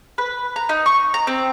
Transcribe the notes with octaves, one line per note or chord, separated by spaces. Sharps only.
B4
A#5
D#4
C#6
A#5
C4